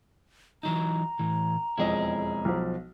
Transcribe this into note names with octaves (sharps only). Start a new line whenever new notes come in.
E3 F#3 D#4 A#5
A2 E3
E1 F2 E4 G#4 D#5
B1 F3